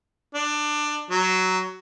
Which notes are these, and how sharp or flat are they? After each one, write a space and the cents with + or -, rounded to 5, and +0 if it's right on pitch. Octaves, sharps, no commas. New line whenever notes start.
D4 +20
F#3 +10